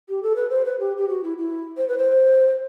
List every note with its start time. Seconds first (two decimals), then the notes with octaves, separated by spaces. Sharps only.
0.09 G4
0.23 A4
0.36 B4
0.50 C5
0.65 B4
0.80 G4
0.97 G4
1.08 F#4
1.24 E4
1.38 E4
1.77 C5
1.88 B4
1.98 C5